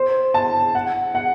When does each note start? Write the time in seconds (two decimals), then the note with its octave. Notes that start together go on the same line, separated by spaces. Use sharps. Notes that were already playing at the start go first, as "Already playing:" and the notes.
Already playing: C5
0.34 A5
0.75 F#5
1.15 F#5